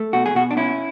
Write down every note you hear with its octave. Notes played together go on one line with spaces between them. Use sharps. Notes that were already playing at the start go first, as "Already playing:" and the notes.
Already playing: A3
B2 F#4
G#4
B2 F#4
D4
C#4 E4